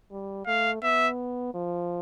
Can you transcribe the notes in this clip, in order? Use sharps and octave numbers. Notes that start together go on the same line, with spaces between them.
G3
A3 F5
B3 E5
F3